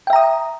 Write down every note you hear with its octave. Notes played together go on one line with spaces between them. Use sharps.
E5 G5 A#5 D#6